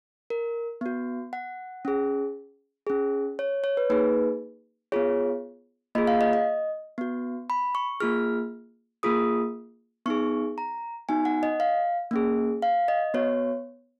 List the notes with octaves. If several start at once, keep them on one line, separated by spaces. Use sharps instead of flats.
A#4
B3 F#4
F#5
C#4 G#4
C#4 G#4
C#5
C#5
B4
A#3 D#4 G#4 B4
B3 F4 G#4 C#5
A#3 F4 G#4 D#5
F5
D#5
D#5
B3 F#4
B5
C#6
A#3 F4 G#4 F6
A#3 F4 G#4 D#6
B3 D#4 G#4 C#6
A#5
B3 D#4 F#4 G#5
F#5
D#5
F5
A#3 C#4 G#4
F5
D#5
B3 F#4 C#5